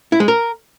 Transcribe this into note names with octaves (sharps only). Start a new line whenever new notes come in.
E4
G#3
A#4